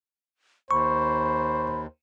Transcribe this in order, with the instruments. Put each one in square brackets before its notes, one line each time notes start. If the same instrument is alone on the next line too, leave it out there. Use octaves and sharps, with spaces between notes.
[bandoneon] D#2 [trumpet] C5 [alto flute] B5 [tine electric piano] C#6